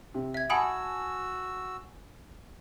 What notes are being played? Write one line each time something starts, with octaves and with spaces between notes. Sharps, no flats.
C3
E5 G#6
F#4 F#5 G#5 A5 B5 D#6 E6 D7